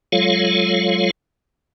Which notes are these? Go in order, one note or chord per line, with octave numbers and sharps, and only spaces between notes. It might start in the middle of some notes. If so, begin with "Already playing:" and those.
F#3 G#3 F4 A4 C#5 F5